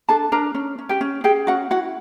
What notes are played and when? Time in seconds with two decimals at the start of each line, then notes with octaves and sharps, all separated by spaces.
0.09 D4 A4 A5
0.32 D4 A#4 A#5
0.54 C#4
0.78 C#4
0.89 G4 G5
1.01 C#4
1.24 G4 G#4 G5
1.47 C#4 F#4 F#5
1.71 E4 F#4 F#5